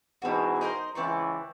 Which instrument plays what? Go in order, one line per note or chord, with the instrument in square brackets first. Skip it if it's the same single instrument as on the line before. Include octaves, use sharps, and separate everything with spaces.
[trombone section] E2 G#2 B2 [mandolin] C4 F#4
[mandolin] D#4 A#4 C5
[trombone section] C#2 E3 [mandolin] C4 D5 C#6